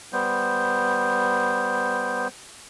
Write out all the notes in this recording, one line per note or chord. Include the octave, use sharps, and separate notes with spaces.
G3 B3 C5